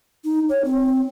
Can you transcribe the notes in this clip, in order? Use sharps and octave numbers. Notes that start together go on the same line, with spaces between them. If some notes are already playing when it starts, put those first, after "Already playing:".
D#4
C#5
C4